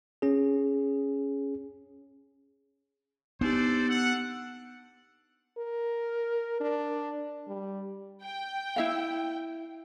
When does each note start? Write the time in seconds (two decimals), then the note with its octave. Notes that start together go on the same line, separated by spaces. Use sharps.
0.22 C#4 G#4
3.41 B3 D4 D#4 G4 A4 C5 D5
3.89 A4 F#5
5.58 A#4
6.61 D4
7.48 G3
8.23 G5
8.76 E4 E5 F5